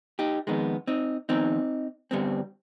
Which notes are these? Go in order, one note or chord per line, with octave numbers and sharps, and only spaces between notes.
D#4 G4
F2 D#3 G#3 B3
C4 D#4
F2 D#3 B3 C4 D#4
G2 D3 G3 B3 C4